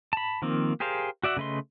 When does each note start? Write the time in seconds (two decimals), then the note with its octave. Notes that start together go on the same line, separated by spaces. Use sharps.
0.13 A5 B5
0.42 D#3 F3 A#3 C4
0.80 G4 G#4 A#4 C5 F5
1.23 F#4 D5 E5 F#5
1.37 C#3 A3 B4 D#5 C6